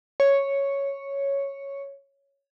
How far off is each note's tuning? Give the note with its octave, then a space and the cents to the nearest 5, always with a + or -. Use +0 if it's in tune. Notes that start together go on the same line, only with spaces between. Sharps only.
C#5 +0